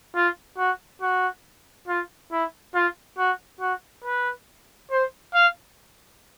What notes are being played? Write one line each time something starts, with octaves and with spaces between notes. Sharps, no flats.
F4
F#4
F#4
F4
E4
F4
F#4
F#4
B4
C5
F5